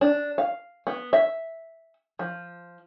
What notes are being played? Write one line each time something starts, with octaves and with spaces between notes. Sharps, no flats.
D4
F5
B3
E5
F3